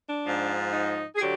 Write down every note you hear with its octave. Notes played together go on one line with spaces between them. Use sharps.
D4
G#2 F3
D#4
G#4
D3 F#3 G4